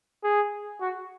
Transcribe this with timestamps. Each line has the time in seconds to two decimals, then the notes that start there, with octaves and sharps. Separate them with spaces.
0.23 G#4
0.81 F#4